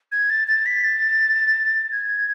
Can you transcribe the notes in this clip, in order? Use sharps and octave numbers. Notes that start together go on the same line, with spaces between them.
G#6
A6
A6
B6
A6
G#6